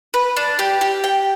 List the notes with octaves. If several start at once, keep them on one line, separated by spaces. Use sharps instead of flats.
B4
D4
G4
G4
G5